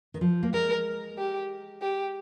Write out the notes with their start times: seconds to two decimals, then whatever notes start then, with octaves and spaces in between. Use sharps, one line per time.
0.14 D#3
0.21 F3
0.43 A#3
0.53 G#3 A#4
1.18 G4
1.82 G4